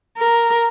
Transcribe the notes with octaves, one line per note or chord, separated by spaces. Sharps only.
A#4